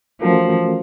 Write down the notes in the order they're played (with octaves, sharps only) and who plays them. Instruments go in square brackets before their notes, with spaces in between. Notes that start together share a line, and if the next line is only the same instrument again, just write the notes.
[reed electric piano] E3 A3 C#4 F#4 A#4 [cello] F3